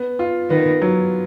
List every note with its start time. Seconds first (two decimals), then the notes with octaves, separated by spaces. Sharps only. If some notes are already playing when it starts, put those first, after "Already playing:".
Already playing: B3
0.19 F4
0.50 D#3 B3
0.82 F#3